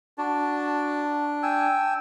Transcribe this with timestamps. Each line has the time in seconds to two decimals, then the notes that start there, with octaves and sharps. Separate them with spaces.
0.18 D4 F#4 A5
1.43 G5 G#5 E6